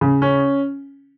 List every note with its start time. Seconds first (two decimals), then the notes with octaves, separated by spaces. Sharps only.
0.01 C#3
0.22 C#4